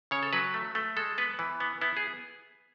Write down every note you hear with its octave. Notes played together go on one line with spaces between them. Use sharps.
C#3 C#5
A4
F#3 B4
A3
A3
G#3 A4
B3 B4
E3
B3
B3 E4
G#4